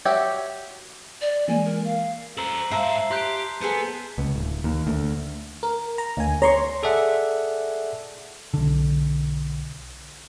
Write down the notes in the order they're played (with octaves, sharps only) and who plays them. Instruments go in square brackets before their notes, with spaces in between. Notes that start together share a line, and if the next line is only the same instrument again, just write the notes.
[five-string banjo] F#4 G4 C#5 E5 F#5
[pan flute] D5
[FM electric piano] E3 G#3 A#3 [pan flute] G#5
[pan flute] A#4
F5
[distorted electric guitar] A4 C5 [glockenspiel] A#5 E6 F#7
[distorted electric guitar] G#2 F5 [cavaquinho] C5 E5 A#5 [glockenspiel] A5 C7
[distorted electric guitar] G4 [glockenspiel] C6 F#6 G6
[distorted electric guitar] B3 [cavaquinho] G#4 A4 C5
[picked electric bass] C#2
D1
D#2
D2
[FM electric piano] A#4
A#5
D2 G#5
[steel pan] C#5 [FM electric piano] A#5 C6 C#6
[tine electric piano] G#4 A4 D5 E5 F#5
[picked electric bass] B1 D3